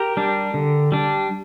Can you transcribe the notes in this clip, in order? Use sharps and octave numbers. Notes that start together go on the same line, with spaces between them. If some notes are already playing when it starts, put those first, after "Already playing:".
Already playing: G4 A#4
G3 D4
D3
G3 D4